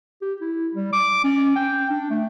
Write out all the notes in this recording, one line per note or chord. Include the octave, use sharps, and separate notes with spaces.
G4
E4
G3
D6
C#4
G5
D4
A3